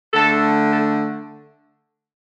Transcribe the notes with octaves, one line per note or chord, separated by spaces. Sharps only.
D3 A3 A4
A4